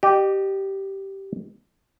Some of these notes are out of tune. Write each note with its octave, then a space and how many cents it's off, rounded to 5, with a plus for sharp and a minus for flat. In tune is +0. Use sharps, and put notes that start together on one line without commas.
G4 -10 D#5 -40